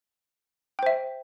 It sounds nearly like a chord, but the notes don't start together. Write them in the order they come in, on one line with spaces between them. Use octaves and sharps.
G5 C5 E5